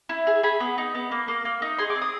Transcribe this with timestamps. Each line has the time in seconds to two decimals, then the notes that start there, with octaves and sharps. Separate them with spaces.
0.09 E4
0.27 G#4
0.43 G#4 B5
0.60 B3
0.78 D#4
0.95 B3
1.11 A#3
1.28 A#3
1.45 A#3
1.62 D#4
1.78 G#4 C6
1.90 D6
1.96 C4
2.02 D#6